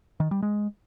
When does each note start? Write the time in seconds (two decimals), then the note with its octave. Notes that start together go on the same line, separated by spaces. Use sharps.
0.20 D#3
0.31 G3
0.42 G#3